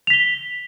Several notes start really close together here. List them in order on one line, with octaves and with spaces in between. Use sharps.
F7 B6 G7